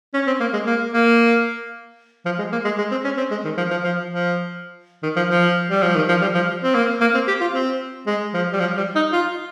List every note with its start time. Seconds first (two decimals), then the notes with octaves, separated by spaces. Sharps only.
0.14 C#4
0.27 C4
0.40 A#3
0.53 G#3
0.67 A#3
0.93 A#3
2.25 F3
2.38 G#3
2.52 A#3
2.65 G#3
2.78 G#3
2.91 C4
3.04 C#4
3.18 C4
3.31 G#3
3.44 D#3
3.57 F3
3.71 F3
3.83 F3
4.10 F3
5.03 D#3
5.16 F3
5.29 F3
5.70 G3
5.83 F3
5.96 D#3
6.09 F3
6.22 G3
6.35 F3
6.64 C4
6.75 A#3
7.01 A#3
7.14 C4
7.28 G4
7.41 F4
7.54 C4
8.07 G#3
8.34 F3
8.53 G3
8.60 F3
8.77 G3
8.95 D#4
9.13 F4